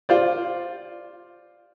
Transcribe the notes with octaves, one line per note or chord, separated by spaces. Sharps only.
F4 C5 D5